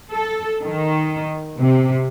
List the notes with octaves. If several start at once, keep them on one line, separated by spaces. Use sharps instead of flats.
A4
D#3
C3